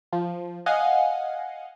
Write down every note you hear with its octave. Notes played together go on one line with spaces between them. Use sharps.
F3
D#5 F5 F#5 G#5